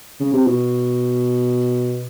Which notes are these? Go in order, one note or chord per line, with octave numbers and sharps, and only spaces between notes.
C#3
C3
B2